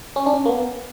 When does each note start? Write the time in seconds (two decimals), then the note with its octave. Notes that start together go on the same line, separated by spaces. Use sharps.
0.16 C#4
0.26 D4
0.33 C#4
0.46 A#3
0.49 B3